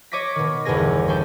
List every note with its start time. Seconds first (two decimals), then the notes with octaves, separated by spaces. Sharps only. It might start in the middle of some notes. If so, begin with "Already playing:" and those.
0.12 C#5 D#5 D6 A#6 B6
0.36 B2 D#3
0.65 G1 E2 B2 D3 G#4 A#6
1.08 C#4 D4 G5